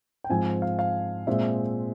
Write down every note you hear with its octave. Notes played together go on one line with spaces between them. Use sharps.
G5
G#2 F3 C4 G#5
F5
F5
A#2 G#3 C4 E5